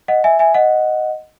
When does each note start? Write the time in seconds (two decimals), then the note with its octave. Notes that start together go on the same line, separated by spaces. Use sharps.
0.08 D#5 F#5
0.24 E5 G#5
0.39 E5 G#5
0.54 D#5 F#5